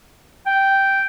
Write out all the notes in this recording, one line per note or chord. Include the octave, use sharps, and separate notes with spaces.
G5